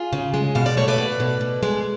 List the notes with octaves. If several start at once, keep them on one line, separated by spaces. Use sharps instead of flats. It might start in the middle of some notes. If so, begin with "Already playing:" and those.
Already playing: F4 G#4
C#3
G#3
B2 F5
D5
A3 C#5
B4 D5
B2
B2
B2
G#3